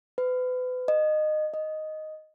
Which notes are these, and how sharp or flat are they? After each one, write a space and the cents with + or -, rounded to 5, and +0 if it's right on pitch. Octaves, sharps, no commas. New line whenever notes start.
B4 +35
D#5 -20
D#5 +0